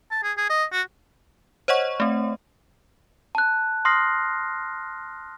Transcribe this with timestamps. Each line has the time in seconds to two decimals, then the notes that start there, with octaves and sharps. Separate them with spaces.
0.11 A5
0.23 G#4
0.37 G#4
0.49 D#5
0.72 F#4
1.68 C5 C#5 D#5 F#5 C#6
2.00 A3 C4
3.35 A5 F#6
3.85 C6 D#6 F6 A#6 C7